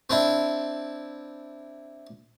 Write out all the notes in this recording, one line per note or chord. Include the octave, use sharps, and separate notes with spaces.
C4 D4 E4